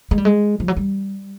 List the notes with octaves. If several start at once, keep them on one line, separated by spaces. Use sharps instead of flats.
G#3
G3
G#3
F3
F#3
G3